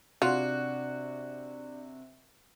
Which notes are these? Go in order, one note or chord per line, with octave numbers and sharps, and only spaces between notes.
C3 D4 F4 F#4 D5